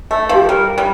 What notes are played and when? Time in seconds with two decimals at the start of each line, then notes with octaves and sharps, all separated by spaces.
0.11 A3
0.29 F3 G4
0.41 A4
0.49 G3 A#4
0.78 G3